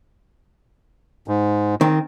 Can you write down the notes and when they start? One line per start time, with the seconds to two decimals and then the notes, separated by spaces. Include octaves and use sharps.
1.28 G#2
1.81 D#3 C4